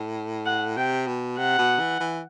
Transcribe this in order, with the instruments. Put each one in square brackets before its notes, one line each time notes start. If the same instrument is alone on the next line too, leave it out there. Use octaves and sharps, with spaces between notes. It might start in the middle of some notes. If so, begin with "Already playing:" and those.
Already playing: [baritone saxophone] A2
[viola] F#5
[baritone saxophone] C3 [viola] G5
[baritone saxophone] B2
[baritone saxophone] C3 [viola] F#5
[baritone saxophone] B2
E3
E3